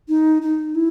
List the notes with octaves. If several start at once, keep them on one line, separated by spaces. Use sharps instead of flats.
D#4
D#4
E4